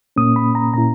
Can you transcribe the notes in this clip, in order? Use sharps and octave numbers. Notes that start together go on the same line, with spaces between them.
A#2 A#3 C#4 D#6
B5
A#5
A#2 A#3 C#4 E4 A#5